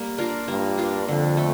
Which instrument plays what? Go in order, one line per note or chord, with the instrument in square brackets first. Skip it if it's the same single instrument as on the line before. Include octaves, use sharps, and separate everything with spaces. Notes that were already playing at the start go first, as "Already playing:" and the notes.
Already playing: [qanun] G3 A#3
D4 F4 A#4
[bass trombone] G2 [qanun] A#3
[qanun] D4 F4 A#4
[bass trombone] F2 [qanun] D3
[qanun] A3